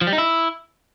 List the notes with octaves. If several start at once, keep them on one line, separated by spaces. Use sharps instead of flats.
F3
G3
D#4
E4